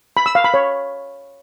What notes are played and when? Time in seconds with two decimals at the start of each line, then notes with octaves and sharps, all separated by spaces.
0.17 B5
0.26 E6
0.35 F5
0.44 B5
0.54 C#5